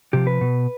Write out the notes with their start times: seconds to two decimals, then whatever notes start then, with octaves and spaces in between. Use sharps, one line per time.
0.13 C3 F3 G4
0.27 B4
0.41 B2